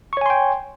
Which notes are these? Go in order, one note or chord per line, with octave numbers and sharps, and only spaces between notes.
C#5 G5 G#5 C6 C#6